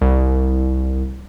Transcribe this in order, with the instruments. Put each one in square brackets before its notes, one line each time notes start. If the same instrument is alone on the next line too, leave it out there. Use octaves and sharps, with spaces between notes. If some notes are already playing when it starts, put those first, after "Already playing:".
[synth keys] C2